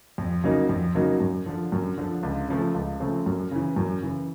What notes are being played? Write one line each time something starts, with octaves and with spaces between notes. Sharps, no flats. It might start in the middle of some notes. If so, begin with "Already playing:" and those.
F2
C#3 F#3 A#3 D#4
F2
C#3 F#3 A#3 D#4
F#2
D3 F3
F#2
D3 F3
C#2
C#3 F3 A3 C4
C#2
C#3 F3 A3 C4
F#2
C#3 E3
F#2
C#3 E3